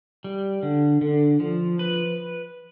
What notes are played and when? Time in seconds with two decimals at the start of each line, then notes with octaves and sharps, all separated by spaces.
0.24 G3
0.63 D3
1.01 D3
1.40 F3
1.79 B4